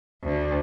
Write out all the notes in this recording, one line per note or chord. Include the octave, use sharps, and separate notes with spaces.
D2